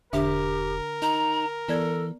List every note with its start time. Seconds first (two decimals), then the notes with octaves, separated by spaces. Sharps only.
0.13 E1 D3 D4 G4 A#4 E5
1.02 D#4 A#5
1.69 E3 B3 A4 D5 G#6